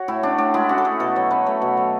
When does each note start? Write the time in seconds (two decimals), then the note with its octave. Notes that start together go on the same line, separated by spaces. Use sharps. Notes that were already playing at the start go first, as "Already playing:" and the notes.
Already playing: F#4 C#5 F#5
0.08 A2 E4
0.23 C#4 D4
0.38 A2 D4
0.54 G#3 E4
0.69 C#4 F#4
0.78 A4
0.85 A3 G#4
1.00 B2 A4
1.16 F#3 C#5
1.31 C#4 B4
1.46 A3 C#5
1.62 B2
1.77 F#3